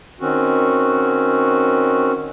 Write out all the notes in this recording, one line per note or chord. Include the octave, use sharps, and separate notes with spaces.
D#3 C4 C#4 F#4